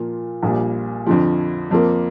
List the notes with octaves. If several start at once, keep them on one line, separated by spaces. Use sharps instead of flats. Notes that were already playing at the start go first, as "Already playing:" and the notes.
Already playing: A#2 F3 A#3 F4
A#1 A#2 G3
F2 D3 F3
F2 F3 A#3